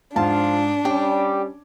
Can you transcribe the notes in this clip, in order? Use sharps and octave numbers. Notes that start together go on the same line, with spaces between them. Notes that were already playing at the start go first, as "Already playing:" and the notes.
G#2 F3 D4 F4 A5
G3 C#4 G4